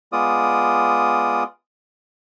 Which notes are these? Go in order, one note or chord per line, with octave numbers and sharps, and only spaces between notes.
G#3 B3 F4 D5 D#6